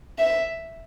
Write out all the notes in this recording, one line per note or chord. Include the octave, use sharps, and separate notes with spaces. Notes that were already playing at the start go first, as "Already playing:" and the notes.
E5